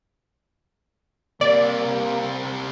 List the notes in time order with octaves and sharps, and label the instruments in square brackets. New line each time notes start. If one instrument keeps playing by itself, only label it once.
[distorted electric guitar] C3 G3 [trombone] A#3 [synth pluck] D5